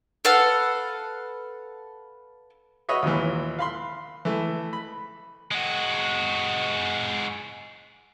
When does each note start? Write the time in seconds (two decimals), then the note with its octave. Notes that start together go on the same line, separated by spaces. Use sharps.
0.25 A4 B4 F5 F#5
2.89 F#4 B4 C#5 D#5 E5
3.02 D#2 A#2 E3
3.59 F5 B5 C6
4.25 E3 A3
4.73 B5
5.51 G#3 F#4